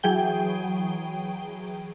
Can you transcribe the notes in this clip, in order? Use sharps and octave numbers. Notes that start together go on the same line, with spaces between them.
E3 F#3 G#4 G5 G7